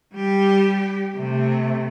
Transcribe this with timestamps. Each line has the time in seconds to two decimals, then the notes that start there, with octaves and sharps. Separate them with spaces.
0.14 G3 G4
1.16 C3 A3